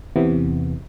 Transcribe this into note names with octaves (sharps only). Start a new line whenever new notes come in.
E2 C3 E3 B3